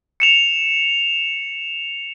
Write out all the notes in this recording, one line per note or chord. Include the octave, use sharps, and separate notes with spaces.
C#7 E7 F7